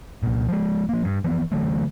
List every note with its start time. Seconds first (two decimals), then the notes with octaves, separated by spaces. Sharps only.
0.23 C2 A#2
0.49 F3 G#3
0.89 F3 A#3
1.05 G2
1.24 E3 F3 B3
1.52 D3 E3 F#3 A3